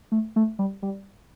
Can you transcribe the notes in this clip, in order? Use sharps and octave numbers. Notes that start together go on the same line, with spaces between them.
A3
A3
G3
G3